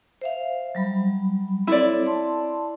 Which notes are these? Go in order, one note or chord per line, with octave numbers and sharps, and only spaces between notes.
C5 E5 F5
F#3 G3 B5
C4 E4 A4 C#5 D5
A5 C6